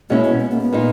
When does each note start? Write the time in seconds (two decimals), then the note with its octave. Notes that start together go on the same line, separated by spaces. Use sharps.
0.10 B2 G#3 A#3 C#4 E4
0.24 B3
0.40 B3
0.51 A#3
0.61 B3
0.73 A#2 G#3 D#4